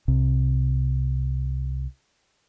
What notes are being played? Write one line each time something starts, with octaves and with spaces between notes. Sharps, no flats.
C2 C3